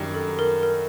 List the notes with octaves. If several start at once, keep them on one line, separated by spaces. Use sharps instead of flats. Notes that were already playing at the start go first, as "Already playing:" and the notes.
Already playing: F#2 D#3 G3 D4
A4
A#4
A#4